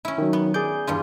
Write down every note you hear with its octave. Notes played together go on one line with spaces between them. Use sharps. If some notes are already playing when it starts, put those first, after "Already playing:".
C#4 E4
D#3 F#3
B3
G#4 D5 G6
E2 G2 F4